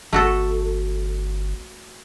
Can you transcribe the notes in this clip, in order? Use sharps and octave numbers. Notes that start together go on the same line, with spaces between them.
G1 A3 F#4 A4